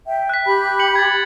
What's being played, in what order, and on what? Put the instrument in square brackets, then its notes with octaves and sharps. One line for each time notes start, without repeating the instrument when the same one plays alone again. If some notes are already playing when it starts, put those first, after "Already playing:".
[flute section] E5 G5
[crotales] F#6 B6
[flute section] G4 B5
[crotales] C#7 F#7
G#6 A6